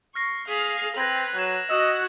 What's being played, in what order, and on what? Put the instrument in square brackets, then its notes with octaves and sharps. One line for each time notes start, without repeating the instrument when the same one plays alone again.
[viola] C#6 [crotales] F6 A#6 C7
[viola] G#4 F5 [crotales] F6 B6 F7
[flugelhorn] C4 [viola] B4 [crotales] G#6 A#6 F#7
[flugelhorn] F#3 [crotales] F#6 G#6 E7
[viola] F#4 F#5 [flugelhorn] D#5 [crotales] E6 E7 F#7